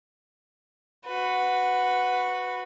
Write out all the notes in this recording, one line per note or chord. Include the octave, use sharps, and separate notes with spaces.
F#4 B4